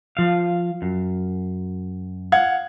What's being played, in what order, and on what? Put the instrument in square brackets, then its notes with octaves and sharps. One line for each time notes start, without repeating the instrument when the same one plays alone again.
[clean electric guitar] F3 F5
F#2
[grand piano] F5 F#5 G#6